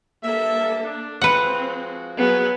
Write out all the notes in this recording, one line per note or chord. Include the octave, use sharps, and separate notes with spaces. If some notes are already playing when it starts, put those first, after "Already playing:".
G2 A#3 A4 E5 A5
D4
F3 G#3 C4 F#4 B4 F#5
F#3 B3 G#4 G#5